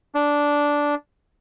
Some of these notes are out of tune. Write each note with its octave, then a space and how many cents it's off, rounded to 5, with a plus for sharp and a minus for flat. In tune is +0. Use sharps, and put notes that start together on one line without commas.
D4 -10